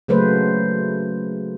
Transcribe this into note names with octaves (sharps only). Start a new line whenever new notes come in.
C#3 F#3 A3 A#3 B4 C5